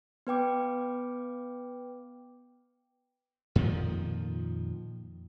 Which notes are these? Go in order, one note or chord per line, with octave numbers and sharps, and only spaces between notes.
B3 B4 G5 D6
F2 A#2 D#3 F3